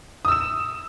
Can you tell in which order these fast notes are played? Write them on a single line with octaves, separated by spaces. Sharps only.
D#6 E6 E7